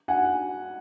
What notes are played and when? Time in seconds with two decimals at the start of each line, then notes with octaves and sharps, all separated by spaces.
0.08 F#5 G#5